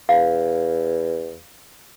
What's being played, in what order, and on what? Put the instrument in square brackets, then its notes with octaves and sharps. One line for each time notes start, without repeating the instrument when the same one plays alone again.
[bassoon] E2 [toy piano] F5